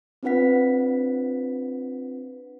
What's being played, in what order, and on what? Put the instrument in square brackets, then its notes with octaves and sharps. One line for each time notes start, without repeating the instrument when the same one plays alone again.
[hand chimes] C4 D4 F4 B4 F#5 B6